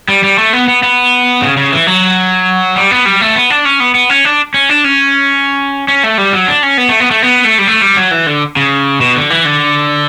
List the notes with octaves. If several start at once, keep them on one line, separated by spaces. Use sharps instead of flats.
G3
G3
A3
B3
B3
B3
C#3
C#3
E3
F#3
G3
B3
G3
A3
B3
D4
C#4
B3
B3
C#4
D4
C#4
D4
C#4
C#4
A3
G3
F#3
D4
C#4
B3
A3
B3
A3
B3
A3
G3
A3
G3
F#3
E3
D3
C#3
B2
D3
E3
D3